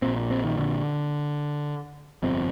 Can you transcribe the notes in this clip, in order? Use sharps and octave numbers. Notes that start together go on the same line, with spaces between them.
A#1 A#2 C4
C4
D#3
D3
G1 F2 C3 C4